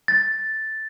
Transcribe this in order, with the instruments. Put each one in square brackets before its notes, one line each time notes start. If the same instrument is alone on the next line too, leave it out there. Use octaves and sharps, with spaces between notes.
[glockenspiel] A6